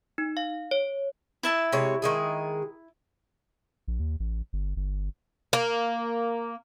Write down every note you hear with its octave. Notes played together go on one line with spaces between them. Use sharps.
D#4
F5
C#5
E4 E5 A5
C3 G#3 C#5
D#3 G#3 G#4
A#1
D#2
A1
G1
G1
A#3